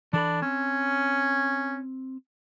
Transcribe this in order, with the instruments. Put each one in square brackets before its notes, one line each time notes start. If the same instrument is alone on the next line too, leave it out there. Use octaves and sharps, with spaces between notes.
[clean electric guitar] E3 A4 B5 [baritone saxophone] D4
[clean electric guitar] C4 [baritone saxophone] C#4